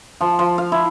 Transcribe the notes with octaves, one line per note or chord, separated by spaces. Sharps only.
F3
F3
F5
E4